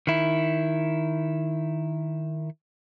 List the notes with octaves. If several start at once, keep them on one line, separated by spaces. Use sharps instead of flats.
D#3 E4